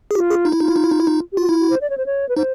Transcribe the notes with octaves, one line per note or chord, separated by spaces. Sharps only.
G#4
F4 G4
G#4
D#4
E4
D#4 F4
E4
D#4
E4
D#4
E4
D#4
G4
F4 F#4
E4 F4
F#4
C5
D5
C#5
C5
C#5
B4
D#4 C5